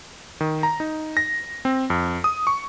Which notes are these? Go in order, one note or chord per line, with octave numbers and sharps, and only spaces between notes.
D#3
A#5
D#4
A#6
C4
F2
D#6
C#6